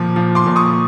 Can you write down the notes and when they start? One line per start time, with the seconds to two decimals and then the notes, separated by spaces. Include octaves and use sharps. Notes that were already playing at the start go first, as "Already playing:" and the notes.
Already playing: A#2 F3 D6
0.16 F3
0.35 C6 D6
0.46 A#2
0.56 C#6 D#6